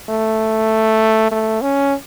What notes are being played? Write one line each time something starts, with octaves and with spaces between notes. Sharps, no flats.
A3
A3
C#4